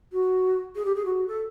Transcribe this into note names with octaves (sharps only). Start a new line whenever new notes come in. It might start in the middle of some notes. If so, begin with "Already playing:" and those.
F#4
G#4
G4
G#4
F#4
A4